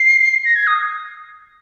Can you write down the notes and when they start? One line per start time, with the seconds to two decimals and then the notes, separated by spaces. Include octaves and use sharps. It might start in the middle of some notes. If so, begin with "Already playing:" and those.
Already playing: C7
0.45 A#6
0.56 G#6
0.67 D#6